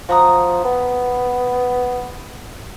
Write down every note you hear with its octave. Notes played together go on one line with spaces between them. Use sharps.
F3 F#4 A#5 D#6
B3